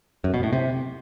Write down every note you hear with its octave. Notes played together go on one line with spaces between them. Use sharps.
F#2
B2
A2
C3